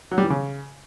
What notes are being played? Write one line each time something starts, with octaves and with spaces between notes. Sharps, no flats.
F#3
G3
E3
C#3